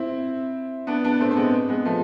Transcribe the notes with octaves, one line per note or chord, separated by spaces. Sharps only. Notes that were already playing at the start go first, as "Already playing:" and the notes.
Already playing: C4 E4
B3 D4
B3 D4
A3 C4
C4
G#3 B3
G#3 B3
F3 A3